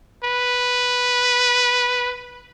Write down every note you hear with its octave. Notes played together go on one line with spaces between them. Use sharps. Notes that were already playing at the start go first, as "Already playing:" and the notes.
B4